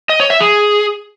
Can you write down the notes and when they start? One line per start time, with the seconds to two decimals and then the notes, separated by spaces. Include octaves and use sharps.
0.09 D#5
0.20 C#5
0.30 E5
0.40 G#4